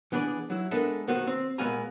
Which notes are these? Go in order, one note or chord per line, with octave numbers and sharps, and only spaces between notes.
E3 B3 D4 G#4 D5
F#3 E4
G#3 B3 D4 A4 A#4 E5
B1 D#3 B3 F#4 C5
C4
A#2 G#3 B3 F5 G#5 A#5